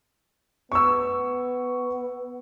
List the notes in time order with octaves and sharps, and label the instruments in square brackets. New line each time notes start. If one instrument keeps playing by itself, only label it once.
[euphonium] B3 [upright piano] C#6 E6